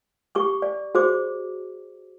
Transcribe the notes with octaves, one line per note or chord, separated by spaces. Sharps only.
G4 C#6 D6
D5
F#4 G#4 C5 D6